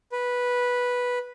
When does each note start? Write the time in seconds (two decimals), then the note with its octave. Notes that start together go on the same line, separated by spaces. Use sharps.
0.12 B4